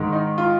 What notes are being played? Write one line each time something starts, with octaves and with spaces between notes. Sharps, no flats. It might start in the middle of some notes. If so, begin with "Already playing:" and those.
Already playing: G#2 D#3
D#4
F4